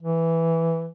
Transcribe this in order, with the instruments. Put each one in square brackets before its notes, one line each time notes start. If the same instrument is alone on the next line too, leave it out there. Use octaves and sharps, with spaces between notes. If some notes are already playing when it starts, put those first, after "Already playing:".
[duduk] E3